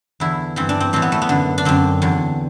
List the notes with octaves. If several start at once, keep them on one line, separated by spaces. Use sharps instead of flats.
E2 D3 E4
G2 E3 C4
D4
C4
A2 E3 C4
B3
A3
B3
F#2 D3
D4
F#2 D3 C4
E2 D3